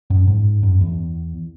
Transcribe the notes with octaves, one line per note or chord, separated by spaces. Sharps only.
F#2
G#2
F#2
E2